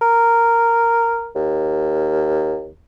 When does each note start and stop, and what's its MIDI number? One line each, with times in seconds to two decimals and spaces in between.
0.02 1.30 70
1.35 2.70 39